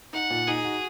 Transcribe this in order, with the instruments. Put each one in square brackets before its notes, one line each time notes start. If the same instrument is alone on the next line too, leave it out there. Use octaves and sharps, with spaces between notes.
[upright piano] D#4 [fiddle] F#5
[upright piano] A#2
[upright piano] D#4 [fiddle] G#4
[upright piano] F#4